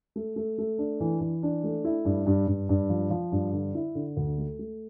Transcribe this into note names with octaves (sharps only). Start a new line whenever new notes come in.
A3
A3
A3
D4
E3
E3
D4
A3
E4
G2
G2
G2
G2
F3
F3
G2
D3
E4
D3
D2
A3
A3